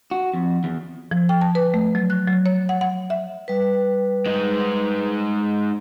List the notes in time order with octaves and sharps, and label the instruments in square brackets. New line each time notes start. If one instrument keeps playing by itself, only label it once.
[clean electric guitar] F#4
F2
E2
[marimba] F3
G5
A5
B4
A3
F#3
F#6
F#3
C#5
F#5
F#5
E5
[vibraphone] G3 B4
[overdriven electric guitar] G#3 D#4